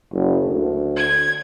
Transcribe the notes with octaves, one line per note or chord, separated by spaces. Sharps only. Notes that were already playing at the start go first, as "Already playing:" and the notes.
F#1
D2
G#6